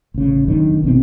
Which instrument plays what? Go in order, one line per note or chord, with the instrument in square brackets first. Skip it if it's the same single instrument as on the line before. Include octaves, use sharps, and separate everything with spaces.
[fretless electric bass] A1 C#3
F1 F#2 D#3 D4
B1 B2 D#3 C4